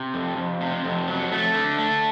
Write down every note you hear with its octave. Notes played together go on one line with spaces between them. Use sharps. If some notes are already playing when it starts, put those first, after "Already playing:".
Already playing: C3
F2
F2
C3
F2
F#3
A3
D3
A3